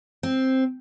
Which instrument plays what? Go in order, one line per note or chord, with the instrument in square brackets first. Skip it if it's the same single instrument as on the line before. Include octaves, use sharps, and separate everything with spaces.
[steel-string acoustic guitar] C4